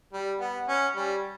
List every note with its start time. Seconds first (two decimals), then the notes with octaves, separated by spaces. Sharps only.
0.13 G3
0.40 B3
0.68 C#4
0.96 G3